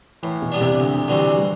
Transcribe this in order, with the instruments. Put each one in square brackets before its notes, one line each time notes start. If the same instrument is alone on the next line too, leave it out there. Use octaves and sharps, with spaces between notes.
[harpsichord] A2 [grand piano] E3
[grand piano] B2
[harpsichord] G3 B3 D4
[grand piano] C3
[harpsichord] D2 [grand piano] D3
[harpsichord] D3 G3 C4 F#4 [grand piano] E3
[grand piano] G3